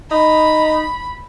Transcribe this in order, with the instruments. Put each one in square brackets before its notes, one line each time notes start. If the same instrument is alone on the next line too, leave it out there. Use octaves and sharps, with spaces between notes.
[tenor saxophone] D#4 [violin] B5